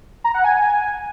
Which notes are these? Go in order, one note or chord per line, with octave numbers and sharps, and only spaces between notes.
A#5
F#5
G#5